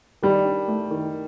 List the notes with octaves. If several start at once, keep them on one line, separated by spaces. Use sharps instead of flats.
D#3 G3
D4
A3
D#3